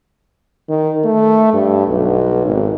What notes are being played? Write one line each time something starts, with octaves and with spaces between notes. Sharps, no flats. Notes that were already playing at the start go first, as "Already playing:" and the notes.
D#3
A3
G2
B1
G#1